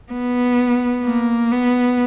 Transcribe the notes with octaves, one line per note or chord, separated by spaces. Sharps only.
B3
A#3
B3